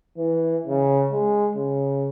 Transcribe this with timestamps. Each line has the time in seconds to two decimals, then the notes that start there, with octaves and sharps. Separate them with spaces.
0.17 E3
0.67 C#3
1.12 G#3
1.55 C#3